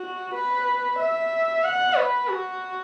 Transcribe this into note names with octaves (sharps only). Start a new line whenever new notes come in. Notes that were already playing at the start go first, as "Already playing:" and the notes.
Already playing: F#4
B4
E5
F#5
B4
F#4